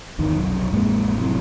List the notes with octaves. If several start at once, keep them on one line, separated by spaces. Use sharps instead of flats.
G#1 E2 D#3
F1 B1 F#2
A1 F2 G#3 A#3
F1 F#2 A2 C3